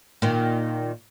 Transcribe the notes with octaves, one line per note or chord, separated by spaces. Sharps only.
A#2 D#3